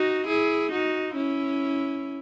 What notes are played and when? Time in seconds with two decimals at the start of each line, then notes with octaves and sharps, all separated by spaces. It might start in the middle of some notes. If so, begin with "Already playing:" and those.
Already playing: D#4 F#4
0.27 E4 G#4
0.71 D#4 F#4
1.16 C#4 E4